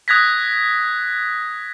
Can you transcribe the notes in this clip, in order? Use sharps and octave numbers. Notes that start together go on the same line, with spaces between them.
D#6 F#6 G#6 A#6 B6